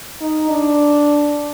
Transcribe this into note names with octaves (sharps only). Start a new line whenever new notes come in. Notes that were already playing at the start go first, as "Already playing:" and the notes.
D#4
D4